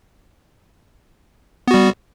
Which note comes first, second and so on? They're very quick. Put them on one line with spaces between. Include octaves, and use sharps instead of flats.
B3 F#4 G3